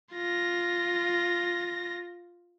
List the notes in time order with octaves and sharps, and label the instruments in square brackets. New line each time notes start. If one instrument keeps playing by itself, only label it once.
[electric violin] F4 A#6